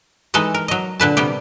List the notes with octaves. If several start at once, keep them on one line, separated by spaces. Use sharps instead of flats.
E3 G#3 D#4 A4 B4 D#5
A#4
F#3 D#5
A#2 D3 B4 A5
C3 G3 B3 G4